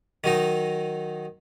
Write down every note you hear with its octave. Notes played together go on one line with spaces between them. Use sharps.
D#3 F#3 D#4